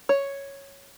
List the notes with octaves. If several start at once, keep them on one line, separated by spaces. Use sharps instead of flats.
C#5